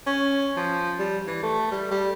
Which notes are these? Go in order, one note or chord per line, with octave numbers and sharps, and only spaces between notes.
C#4
F3
G3
E3
A3
G3
G3